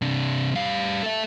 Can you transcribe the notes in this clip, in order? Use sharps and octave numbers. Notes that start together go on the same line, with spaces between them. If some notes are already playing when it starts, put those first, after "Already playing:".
C3 D4
G3 F5
A4 E5